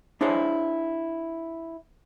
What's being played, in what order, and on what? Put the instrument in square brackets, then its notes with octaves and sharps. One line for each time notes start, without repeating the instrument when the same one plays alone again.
[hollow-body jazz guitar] D4 E4 G#4 C5 C#5